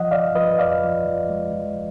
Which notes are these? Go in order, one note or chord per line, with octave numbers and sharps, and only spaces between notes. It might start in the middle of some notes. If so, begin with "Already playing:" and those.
Already playing: F3 D#5 F#5
F3 D5 F5
F3 B4 D#5
F2 D5 F5
F3
F3
G#3
F3